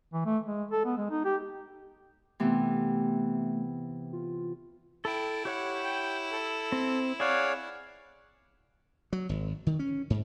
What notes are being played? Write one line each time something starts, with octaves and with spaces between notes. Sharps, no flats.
E3
A3
G#3
A4
B3
G#3
D#4
G4
C3 E3 A3 B3
F4
E4 A4 G5
G4 C#5 F#5
G5
A4
C4
G#4 C#5 D5 F5 F#5
F#3
G#1
D#3
C#4
G#2